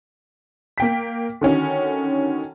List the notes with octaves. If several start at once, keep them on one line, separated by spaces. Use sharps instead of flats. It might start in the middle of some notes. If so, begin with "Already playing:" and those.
A#3 G5 B6
D3 D#3 C#4 F#4